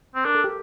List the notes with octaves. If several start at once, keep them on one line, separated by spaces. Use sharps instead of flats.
C4
D4 A#4
A4
G4